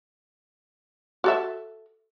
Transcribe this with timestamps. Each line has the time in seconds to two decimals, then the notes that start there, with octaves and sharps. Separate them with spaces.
1.24 F#4 A4 E5